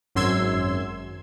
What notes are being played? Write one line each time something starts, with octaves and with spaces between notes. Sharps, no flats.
G#1 F#2 C6 E6 G#6